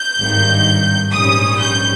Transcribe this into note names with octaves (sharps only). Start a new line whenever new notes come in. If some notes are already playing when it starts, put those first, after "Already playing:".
Already playing: G6
G#1 G2 D#3
A#1 G#2 G3 C#4 D#6
G6